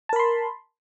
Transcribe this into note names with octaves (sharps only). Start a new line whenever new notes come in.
A#4 A5 B5 C6